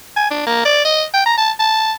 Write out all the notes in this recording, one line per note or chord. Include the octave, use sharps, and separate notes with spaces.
G#5
D4
A#3
D5
D#5
G5
A#5
A5
A5